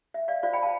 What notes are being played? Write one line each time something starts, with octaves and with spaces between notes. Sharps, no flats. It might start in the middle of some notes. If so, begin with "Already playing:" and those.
E5
D5 F5
F4 C5 D5 F5
G5 B5
F5 A5